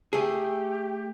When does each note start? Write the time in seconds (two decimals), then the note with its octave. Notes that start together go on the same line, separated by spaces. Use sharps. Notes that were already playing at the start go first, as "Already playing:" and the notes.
0.13 A3 G4 G#4